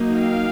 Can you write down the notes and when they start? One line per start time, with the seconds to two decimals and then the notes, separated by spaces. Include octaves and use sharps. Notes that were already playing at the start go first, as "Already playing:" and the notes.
Already playing: F#3 A#3 D#4
0.17 F5 G5